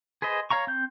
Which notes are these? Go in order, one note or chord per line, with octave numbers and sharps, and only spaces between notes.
G#4 B4 C5 D#5
C#5 F5 A#5 C#6
C4 G6